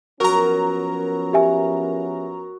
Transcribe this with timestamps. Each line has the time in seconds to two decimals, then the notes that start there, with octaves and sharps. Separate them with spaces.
0.20 F3 F#3 B3 C#4 A#4 A#5
1.33 G4 E5 G#5